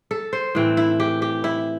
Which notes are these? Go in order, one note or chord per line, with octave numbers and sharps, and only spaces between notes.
A4
C5
A2 E3 C4
E4
G4
G4
E4